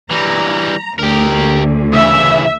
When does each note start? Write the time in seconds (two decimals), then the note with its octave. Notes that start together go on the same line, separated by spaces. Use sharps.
0.11 E3 G3 A#5
0.99 D2 G4 A#4
1.94 C#3 E3 E5